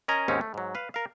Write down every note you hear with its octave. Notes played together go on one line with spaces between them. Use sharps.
C#4 A#4 D#5 G#5 A#5
D#2 G#2 C4 C#4 D#4
A3
G#2 F#3
B4 F5
A#4 F5